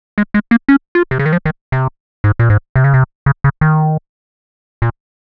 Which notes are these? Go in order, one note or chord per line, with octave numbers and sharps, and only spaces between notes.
G#3
G#3
A#3
C#4
F4
C3
C#3
D#3
F3
D#3
C3
G#2
A#2
G#2
C3
C#3
C3
C#3
C#3
D#3
A#2